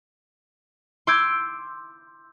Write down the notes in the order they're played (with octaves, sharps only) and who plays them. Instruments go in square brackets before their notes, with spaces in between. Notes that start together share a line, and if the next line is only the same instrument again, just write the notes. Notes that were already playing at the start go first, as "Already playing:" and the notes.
[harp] C6 D6 E6 G6 G#6 D7